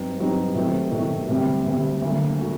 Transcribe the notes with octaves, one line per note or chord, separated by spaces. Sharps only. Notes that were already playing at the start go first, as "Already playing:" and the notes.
Already playing: G2 F#3 C4 D#4
G2 F#3 C4 D#4
C3 D#3 F#3 A3 C4
C3 D#3 F#3 A3 C4
D2 C3 G3 C4
D2 C3 G3 C4
D2 D3 F#3 A#3
D3 F#3